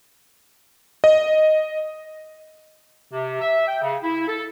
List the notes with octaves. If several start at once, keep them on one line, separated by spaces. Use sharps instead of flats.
D#5
C3
E5
G5
C#3
E4
A4